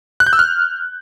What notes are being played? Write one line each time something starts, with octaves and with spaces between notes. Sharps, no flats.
F#6
G6
E6
F6